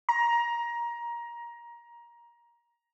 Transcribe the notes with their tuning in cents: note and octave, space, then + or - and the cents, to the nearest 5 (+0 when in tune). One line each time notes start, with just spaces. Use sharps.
A#5 +20